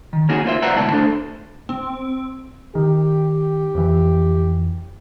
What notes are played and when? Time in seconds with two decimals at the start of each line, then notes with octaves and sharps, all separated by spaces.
0.13 D#3
0.29 A#3 C#4 D#4 F#4 G#4
0.44 A#3 F4 C5 E5
0.62 B4 C5 D5 E5 F#5 A#5
0.75 D2 G#2 B2 E4 A5
0.91 A3 D4 A4 C5
1.69 C4
2.75 D#3 G4
3.75 F2 E3